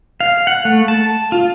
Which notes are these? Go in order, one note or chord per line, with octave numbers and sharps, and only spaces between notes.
F5
F#5
A3
A5
F4